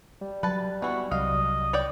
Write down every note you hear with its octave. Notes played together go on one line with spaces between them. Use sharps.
G3
F#3 B4 A5
E3 B3 E4 F#4
C2 F#3 C4 D#5 F5
C#5 D5 G5